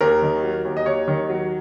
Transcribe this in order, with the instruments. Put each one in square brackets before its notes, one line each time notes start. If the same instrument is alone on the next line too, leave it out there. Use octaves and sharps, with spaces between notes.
[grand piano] D#2 A#4
D#3
F#3
D#2
D#5
D#2 C#5
D#3
F#3